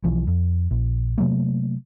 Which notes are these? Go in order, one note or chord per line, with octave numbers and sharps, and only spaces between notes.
B1 E3 F3
F2
A#1
C3 F#3 A3 A#3